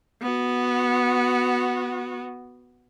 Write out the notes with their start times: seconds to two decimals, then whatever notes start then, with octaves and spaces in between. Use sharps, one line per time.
0.21 B3 F#4